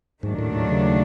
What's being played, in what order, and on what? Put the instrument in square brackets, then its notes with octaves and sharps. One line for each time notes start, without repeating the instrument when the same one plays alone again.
[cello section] D#2 D#3 F#3 A3 D4 [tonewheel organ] G#2
[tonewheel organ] A2
A2
C#3